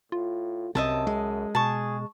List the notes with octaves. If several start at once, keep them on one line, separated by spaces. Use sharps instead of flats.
A2 F4
C2 F#2 C3 D#5 E5 A5
G#3
B2 G#4 A5 C#6